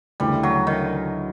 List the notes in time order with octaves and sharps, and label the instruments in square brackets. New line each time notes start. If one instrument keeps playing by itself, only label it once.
[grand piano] D2 C#3 E3 A3 D4 [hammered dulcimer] G3
[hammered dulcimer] F#3
D#3